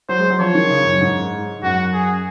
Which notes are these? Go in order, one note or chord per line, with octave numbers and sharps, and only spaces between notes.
F#3 C5
G#3
F#3
F3 C#5
D#3
C#3
F#2
G#2
F#2 F#4
G#4